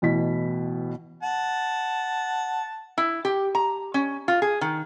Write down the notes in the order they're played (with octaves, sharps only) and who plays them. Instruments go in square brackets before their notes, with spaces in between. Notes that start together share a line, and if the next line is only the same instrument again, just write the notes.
[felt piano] A1 B2 E3 B6
[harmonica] F#5 A5
[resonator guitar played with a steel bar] E4
G4
A#5
C#4
F4
G#4
D#3